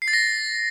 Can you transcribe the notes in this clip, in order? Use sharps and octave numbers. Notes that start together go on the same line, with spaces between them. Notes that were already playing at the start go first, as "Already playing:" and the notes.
C7
A6
A#6